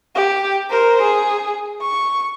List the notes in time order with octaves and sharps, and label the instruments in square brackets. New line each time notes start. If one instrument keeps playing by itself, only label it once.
[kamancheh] G4
A#4 C5
G#4
C#6